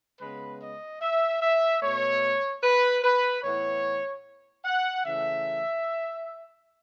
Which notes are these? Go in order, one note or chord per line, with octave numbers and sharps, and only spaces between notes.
C#3 G#3 B3 B4
D#5
E5
E5
B2 A3 C#5
B4
B4
A2 E3 B3 C#5
F#5
C#3 E3 A3 E5